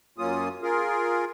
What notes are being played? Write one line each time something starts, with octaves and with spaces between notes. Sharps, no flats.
F#2 F#3 A#3 C#4 F4 D#6
F4 G#4 A#4